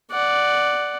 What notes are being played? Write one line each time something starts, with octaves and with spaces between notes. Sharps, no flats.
D5 F#5